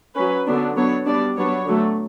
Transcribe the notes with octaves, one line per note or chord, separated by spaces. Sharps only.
F#3 C#4 B4
D3 F#3 B3 D4
F#3 B3 D4 C#5
G3 B3 D4 D5
F#3 B3 D4 C#5
D3 F#3 A3